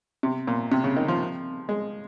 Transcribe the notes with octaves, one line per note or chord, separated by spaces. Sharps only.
C3
A#2
C3
C#3
D#3
F3
G#3